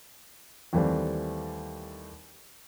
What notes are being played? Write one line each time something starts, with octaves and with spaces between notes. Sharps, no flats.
D#2 E3 G3 A3 C4